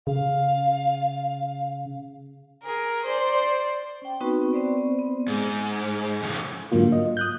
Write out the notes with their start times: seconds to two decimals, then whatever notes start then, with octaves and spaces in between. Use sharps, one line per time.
0.07 C#3 F5
2.63 G#4 A#4
3.05 C5 D5
4.02 C#4 G5
4.21 B3 C4 D#4 F#4 B4 C#6
4.53 B3 C4 C5 D5
4.99 B3
5.28 G#2
6.22 F2 C#3
6.72 G#2 D3 F#3 A#3 F4
6.92 D#5
7.17 D#6 F#6 G6